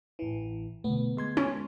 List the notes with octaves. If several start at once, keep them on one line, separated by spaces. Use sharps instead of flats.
A1 E3
B2 D3 A3 B3
G#3 C6 G#6
C#4